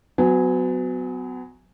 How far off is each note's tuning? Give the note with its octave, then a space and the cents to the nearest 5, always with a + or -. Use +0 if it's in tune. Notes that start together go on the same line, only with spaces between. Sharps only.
F#3 +0 B3 +35 G#5 +0